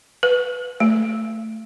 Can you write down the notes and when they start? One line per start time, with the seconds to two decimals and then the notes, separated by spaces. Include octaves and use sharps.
0.23 B4
0.80 A3